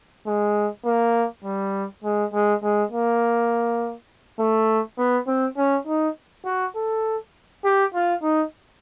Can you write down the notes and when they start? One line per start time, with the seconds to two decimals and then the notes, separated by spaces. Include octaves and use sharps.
0.27 G#3
0.85 A#3
1.44 G3
2.04 G#3
2.33 G#3
2.63 G#3
2.92 A#3
4.39 A3
4.98 B3
5.27 C4
5.57 C#4
5.88 D#4
6.45 F#4
6.76 A4
7.64 G4
7.94 F4
8.23 D#4